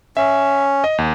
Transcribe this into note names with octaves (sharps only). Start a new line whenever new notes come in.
C#4 E5
D#5
D#2